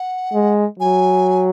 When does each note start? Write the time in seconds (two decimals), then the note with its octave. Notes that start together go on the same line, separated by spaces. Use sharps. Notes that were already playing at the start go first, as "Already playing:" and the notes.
Already playing: F#5
0.33 G#3
0.79 F#3 G#5